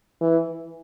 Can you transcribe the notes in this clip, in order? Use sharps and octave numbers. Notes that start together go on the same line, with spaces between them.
E3